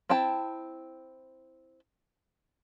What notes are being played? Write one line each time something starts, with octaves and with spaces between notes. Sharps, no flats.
C4 E4 G5 A5